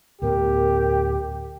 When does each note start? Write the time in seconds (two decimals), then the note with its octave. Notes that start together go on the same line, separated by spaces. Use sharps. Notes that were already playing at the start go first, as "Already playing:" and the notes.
0.22 D2 A2 B3 G4 A#4